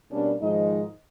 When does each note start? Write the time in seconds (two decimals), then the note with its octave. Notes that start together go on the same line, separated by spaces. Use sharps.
0.11 B2 G3 A#3 C#4 D4
0.41 G#2 D#3 F3 G#3 D#4 D#5